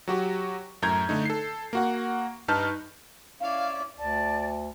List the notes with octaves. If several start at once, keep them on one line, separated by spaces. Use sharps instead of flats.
F#3 F#4 G4
F#2 A2 A#5 G6 G#6
D3 A3 D#4
A4 C7
A#3 F#4 F#5
G2 D#4 B4 A5 F6 G6
C#4 E4 D5 F5
D2 D5 A5